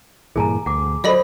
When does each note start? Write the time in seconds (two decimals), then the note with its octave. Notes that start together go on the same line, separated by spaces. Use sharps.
0.36 G2 A#2 E3 G#4 G#5 A#5
0.66 D2 F#5 D6
1.04 F#3 F4 A4 C5 D5 D#5 B5